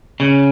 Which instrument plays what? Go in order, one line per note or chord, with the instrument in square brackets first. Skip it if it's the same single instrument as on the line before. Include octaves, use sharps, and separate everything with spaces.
[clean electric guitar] C#3